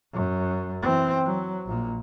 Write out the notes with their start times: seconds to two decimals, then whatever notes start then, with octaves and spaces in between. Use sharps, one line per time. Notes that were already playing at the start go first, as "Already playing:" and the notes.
0.14 F#2
0.82 E3 C4
1.25 F#3
1.66 A#1 A#2